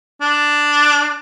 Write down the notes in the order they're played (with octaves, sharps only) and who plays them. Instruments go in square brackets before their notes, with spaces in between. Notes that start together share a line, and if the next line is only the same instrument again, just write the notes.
[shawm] D4